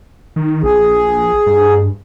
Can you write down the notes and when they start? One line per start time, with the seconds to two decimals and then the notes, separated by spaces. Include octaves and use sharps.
0.36 D#3
0.63 A#1 G#4
1.46 G2